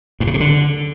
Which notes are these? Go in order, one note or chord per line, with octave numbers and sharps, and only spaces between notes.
G2
C#3
C3
D3